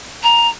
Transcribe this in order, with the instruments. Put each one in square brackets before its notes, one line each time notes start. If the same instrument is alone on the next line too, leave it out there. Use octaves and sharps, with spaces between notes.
[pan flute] A#5